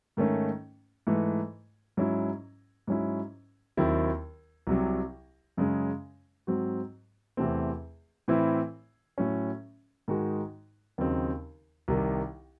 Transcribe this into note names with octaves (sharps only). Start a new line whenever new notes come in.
G#2 D#3 A3 C#4
G#2 E3 A3
G#2 F#3 C#4 E4
G#2 F#3 C#4 E4
D#2 D#3 F#3 C4 E4
C2 C3 F#3
F#2 C#3 G#3 C#4
G#2 F#3 C4 F#4
E2 C3 E3 A3 C4
A2 E3 C4 E4
A2 F#3 C#4
G#2 D#3 G#3 D#4 F#4
D#2 C#3 F#3 C4 D#4
C2 C3 D#3